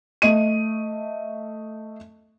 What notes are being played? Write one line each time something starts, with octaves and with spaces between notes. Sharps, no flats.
A3 D#5 D#7